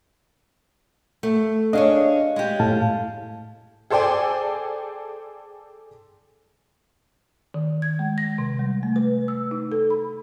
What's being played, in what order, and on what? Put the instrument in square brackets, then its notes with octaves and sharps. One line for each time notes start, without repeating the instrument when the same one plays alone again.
[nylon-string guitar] A3
[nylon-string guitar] D4 G#4 C#5 [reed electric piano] D#5 F5
[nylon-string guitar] G#3 G4
[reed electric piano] A2 F5 A5
[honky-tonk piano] G#4 A4 C5 D5 G5 G#5
[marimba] D#3
G#6
G#3
A#6
C3
G3
A3
B4
E6
D#4
A4
B5